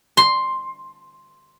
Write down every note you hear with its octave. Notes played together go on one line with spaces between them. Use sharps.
C6